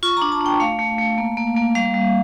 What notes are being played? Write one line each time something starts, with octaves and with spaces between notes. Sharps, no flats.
F4 C#6
D4 A#5
A5
D4
G5
A3 F5
A3
A3
A#3
A#3
A#3
G3 F5
G3